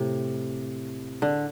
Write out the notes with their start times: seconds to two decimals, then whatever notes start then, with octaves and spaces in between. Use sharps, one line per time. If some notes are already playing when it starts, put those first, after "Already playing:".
Already playing: A2 C3
1.22 D3